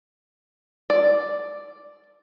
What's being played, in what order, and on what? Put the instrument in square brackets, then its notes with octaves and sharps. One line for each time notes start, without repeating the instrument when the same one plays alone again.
[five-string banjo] D5